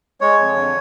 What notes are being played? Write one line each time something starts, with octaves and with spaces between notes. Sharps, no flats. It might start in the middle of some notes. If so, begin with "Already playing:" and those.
G#3 C#5
F2
D3